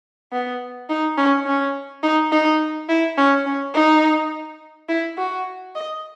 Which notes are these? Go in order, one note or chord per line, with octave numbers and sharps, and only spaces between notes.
B3
D#4
C#4
C#4
D#4
D#4
E4
C#4
C#4
D#4
E4
F#4
D#5